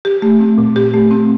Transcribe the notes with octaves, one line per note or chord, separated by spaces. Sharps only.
G4
A3
C4
A#2
G4
A3
C4